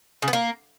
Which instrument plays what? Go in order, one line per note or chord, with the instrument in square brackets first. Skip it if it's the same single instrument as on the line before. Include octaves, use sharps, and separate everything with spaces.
[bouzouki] C#3
B3
A#3